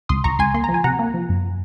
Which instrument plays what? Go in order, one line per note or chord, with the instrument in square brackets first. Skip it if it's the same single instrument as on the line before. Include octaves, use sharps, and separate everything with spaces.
[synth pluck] C#2 C6 D#6
C#2 A#5 C#6
C#2 G#5 C6
A#3 C6
F3 A#5
G#5
C3 F#5 A#5
A#3
F3
F#2